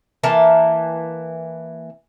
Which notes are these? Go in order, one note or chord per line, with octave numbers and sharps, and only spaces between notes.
E3 A#3 A5